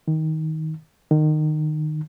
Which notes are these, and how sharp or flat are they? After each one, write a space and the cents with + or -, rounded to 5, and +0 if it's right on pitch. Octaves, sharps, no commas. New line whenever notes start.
D#3 +15
D#3 -25